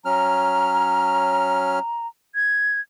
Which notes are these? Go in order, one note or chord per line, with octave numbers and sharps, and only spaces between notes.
F#3 C#4 A#5 F6
G#6